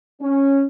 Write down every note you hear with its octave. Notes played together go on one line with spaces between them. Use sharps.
C#4